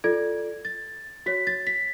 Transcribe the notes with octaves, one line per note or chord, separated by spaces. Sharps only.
F4 A4 D5 G#6
A6
F#4 C#5 B6
A6
B6